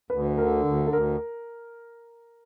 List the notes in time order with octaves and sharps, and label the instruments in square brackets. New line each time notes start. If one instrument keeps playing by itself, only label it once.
[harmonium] D2 [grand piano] B4
[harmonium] D3 [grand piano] A#4
[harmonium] D2
[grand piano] A4
[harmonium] D2 [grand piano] A#4